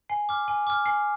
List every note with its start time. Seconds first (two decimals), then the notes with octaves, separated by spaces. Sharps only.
0.09 G#5 C7
0.29 D6 F6
0.48 G#5
0.67 D6 F6
0.86 G#5 C7